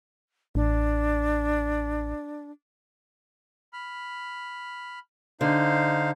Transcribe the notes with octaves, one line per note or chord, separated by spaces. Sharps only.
A1 D4
B5 F6
D3 D#4 C5 F5